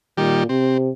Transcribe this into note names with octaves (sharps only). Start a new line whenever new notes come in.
A#2 D#3 G3 G4
C3 C4